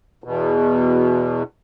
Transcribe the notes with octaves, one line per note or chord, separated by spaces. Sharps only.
E2 B2